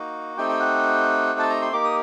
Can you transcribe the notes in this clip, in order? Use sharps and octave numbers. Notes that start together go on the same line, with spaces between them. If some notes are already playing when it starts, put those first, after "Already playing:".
Already playing: A#3 D#4 F#4
A3 C4 D#4 G4 G5
G5
F#5
A5
A#5
C6
A#3 D#4 G4 D6
D#6